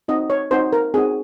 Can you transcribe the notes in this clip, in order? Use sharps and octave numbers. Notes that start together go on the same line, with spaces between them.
C4 D#4 F#4 D#5
C#5
C4 D#4 F#4 C5
A#4
C4 D#4 F#4 G#4